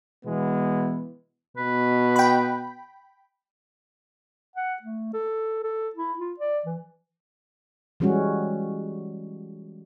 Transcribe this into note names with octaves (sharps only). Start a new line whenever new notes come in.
B2 E3 G#3 B3
B2 B4
G5 B5
F#5
A3
A4
A4
E4
F4
D5
E3
E3 G3 G#3 C#4 F#4